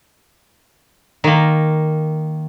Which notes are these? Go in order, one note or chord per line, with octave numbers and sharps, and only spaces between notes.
D#3 A#3